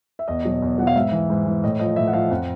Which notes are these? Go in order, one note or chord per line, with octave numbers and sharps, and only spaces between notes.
E5
E2 D#5
B2 F#3
E2
B2 F#3 F#5
F5
G#2 E5
E3
G#2
E3
A2 D#5
F3 D#5
A2 E5
F#5
F3 F5
F2 F#5